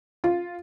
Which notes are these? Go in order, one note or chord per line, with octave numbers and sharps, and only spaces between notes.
F4